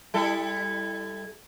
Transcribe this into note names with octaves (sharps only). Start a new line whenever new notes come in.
G3 E4 A4